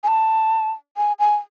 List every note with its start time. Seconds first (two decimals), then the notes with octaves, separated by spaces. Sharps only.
0.04 G#5
0.08 A5
0.97 G#5
1.19 G#5